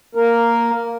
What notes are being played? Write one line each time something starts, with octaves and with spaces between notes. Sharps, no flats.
A#3 A#4